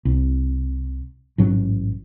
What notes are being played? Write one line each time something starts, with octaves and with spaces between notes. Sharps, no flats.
C2
A1 G#2 F#3